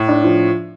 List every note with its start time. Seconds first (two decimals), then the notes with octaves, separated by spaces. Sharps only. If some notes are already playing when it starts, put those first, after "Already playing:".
Already playing: A2
0.08 D4
0.24 F3